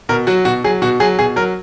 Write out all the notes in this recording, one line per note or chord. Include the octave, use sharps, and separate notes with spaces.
B2 A#4
F#3 F#4
B2 F#4
F#3 G#4
B2 F#4
F#3 G#4
B2 G#4
F#3 A#4